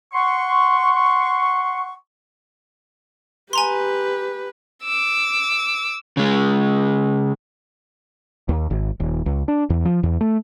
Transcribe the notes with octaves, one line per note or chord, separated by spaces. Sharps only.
F#5 C6 C#6
G4 B4 G#5 A#5 C6
D6 E6
C#3 G#3
D#2
G#1
D#1
C#2
D4
E2
F3
E2
A3